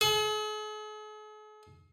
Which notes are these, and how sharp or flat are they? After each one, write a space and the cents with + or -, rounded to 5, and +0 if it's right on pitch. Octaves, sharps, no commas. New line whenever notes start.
G#4 +45